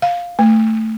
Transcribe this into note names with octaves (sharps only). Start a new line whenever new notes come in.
F5
A3